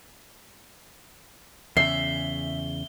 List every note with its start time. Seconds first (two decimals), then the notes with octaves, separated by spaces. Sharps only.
1.77 E2 C#3 E5 C7 G7